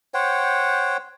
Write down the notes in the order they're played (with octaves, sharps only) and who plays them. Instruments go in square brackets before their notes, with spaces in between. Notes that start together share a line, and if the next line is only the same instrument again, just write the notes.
[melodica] C5 C#5 F#5 G5